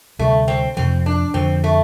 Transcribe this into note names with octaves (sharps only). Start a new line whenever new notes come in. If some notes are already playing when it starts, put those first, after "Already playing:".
D2 C3 G3 A3
C4
F2 C3 F3 C4
D4
F2 D3 F3 C4
A3